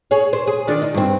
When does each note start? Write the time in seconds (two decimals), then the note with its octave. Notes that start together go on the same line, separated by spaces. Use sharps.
0.11 G#4 C#5
0.33 C5
0.47 G#4
0.68 D#3 D4 F4
0.82 D#4
0.94 G2 C4